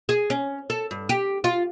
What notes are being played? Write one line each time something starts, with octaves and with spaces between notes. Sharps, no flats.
G#4
C#4
A4
G2
G4
F4